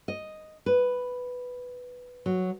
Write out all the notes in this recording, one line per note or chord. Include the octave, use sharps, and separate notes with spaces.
D#5
B4
F#3